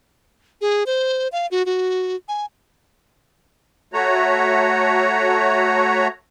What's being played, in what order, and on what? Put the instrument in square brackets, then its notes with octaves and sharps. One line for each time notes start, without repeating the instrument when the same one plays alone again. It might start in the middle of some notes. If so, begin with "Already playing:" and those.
[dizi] G#4
C5
F5
F#4
F#4
G#5
[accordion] A3 F#4 C#5 A#5